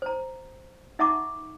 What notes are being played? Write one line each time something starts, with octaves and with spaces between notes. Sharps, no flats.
C5 A#5
D#4 E5 F#5 A#5 C#6 D6